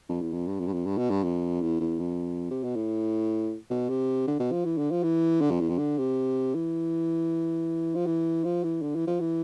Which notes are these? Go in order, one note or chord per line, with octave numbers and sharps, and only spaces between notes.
F2
E2
F2
G2
F2
G2
F2
G2
B2
G2
F2
E2
E2
F2
C3
B2
A2
B2
C3
D3
B2
F3
E3
D3
F3
E3
D3
F2
E2
F2
D3
C3
E3
F3
E3
F3
E3
D3
E3
F3
E3